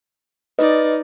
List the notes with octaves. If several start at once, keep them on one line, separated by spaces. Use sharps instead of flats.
D#4 B4 D5 D#5